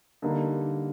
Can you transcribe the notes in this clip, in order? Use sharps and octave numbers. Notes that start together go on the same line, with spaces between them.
D3 G3 A#3 D#4